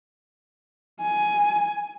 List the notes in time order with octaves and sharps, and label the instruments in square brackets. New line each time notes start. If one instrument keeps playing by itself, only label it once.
[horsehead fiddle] G#5